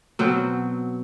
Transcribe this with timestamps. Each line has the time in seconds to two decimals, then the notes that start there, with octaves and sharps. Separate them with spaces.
0.19 B2 F#3 C4